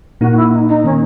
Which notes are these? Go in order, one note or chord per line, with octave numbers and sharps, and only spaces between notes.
A#2 A#3 D#4 F#4
F#4
E4
D#4
D#4
D#3 A#3 C#4